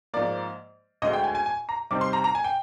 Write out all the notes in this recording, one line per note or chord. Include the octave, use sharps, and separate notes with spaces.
G#2 F3 A#3 D5
D2 D3 G#3 D#5
G5
G#5
G#5
G#5
A#5
C3 G3 C4 D#4 D6
C6
A#5
A#5
G#5
G5